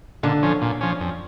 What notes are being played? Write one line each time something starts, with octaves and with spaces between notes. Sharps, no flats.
A#2 D3
F3 C#4
A#2
F3 C#4
F2